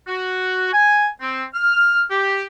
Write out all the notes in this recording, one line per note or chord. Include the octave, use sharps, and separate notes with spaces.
F#4
G#5
C4
F6
G4